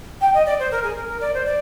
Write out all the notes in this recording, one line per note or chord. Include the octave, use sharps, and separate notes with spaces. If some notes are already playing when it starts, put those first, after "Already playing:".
G5
D#5
D5
C5
A#4
G#4
A#4
A#4
D5
C5
D5